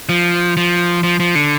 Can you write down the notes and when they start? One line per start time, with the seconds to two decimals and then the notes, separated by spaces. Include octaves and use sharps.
0.09 F3
0.57 F3
1.03 F3
1.20 F3
1.35 D3